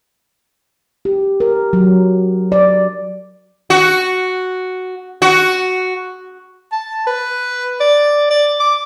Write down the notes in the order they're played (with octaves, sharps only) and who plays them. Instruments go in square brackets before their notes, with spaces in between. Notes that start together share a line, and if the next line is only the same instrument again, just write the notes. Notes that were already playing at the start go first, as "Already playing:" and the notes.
[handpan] G4
A#4
F#3
D5
[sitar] F#4
F#4
[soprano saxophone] A5
B4
D5
D5
D6